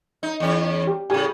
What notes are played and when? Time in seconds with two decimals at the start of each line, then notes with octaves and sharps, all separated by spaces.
0.23 D#4
0.40 E2 C#4
0.87 G4
1.10 A2 C#3 G4 G#5